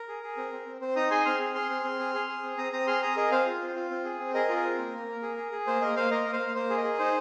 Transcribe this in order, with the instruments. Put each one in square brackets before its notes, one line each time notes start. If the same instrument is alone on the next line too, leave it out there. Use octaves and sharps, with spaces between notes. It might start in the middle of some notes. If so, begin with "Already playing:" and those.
Already playing: [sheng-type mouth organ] A#4
G#4
G#4
C4
C4
C4
C4 C5
D#4 A#5 D#6
G#4 G#5 C6
C4 C6 F6
G#4
G#4 C6 F6
C4
C4
G#4
G#4
G#4
C4
C4 A#5 D#6
C4 A#5 D#6
G#4 C6 F6
G#4 A#5 D#6
G#4 A#4 D#5
C4 C5 F5
F4
C4
F4
C4
G#4
C4
G#4 A#4 D#5
F4
A#4
C4
A#3
A#3
A#3
G#4
G#4
G#4
A#3 C5
A#3 A#4 D#5
A#3 C5 F5
A#3 A#4 D#5
A#3
C5 F5
A#3
A#3 C5
G#4
A#4 D#5
G#4
D#4 C5